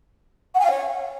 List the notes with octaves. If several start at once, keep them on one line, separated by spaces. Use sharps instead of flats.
F#5
G#5
F5
C#5